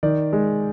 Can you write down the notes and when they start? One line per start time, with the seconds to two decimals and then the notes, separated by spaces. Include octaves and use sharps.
0.03 D#3 D5
0.33 G#3